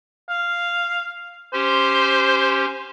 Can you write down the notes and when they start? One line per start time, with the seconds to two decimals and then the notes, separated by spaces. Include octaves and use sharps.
0.29 F5
1.53 C#4 G4 C5